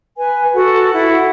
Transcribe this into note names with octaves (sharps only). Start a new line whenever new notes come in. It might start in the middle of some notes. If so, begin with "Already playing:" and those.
B4 G#5
F#4 A4 F#5
E4 F#5